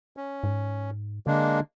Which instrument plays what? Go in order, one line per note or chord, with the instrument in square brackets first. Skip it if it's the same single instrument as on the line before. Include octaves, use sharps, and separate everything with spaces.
[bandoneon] C#4
[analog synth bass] G#2
[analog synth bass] D3 [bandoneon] G#3 A#3 D4